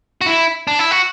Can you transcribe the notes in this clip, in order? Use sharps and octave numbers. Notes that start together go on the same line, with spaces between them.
F#4
E4
D4
E4
F#4